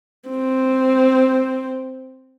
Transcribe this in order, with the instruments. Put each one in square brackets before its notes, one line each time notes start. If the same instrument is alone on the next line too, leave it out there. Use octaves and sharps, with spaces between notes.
[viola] C4